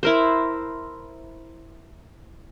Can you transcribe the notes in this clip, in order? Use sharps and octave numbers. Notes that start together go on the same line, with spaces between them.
E4 A#4 C5